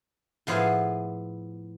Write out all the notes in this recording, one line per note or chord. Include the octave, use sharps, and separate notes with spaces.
A2 F3 B3 G#4 F5 A5